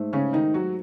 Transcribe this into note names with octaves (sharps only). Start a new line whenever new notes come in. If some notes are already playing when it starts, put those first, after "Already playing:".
Already playing: G#2 A3
C#3 C#4
D#3 D#4
F#3 F#4